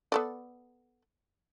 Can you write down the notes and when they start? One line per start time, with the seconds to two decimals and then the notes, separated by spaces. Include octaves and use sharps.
0.12 B3 A4 D5